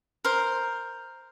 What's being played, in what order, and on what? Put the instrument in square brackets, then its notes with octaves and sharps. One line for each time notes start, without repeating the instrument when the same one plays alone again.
[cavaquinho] A#4 C5